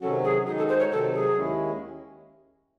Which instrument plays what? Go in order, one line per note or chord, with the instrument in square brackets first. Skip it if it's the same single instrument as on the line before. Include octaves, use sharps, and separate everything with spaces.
[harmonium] C3 D#3 F#3 C#4 F#4 [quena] A4
[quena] G#4
[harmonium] D#3 G#3 D#4 F#4 [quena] G#4
[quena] A4
C5
C#5
[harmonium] C3 D#3 F#3 [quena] A4
[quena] G#4
[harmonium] D#2 D#3 G#3 C#4 E4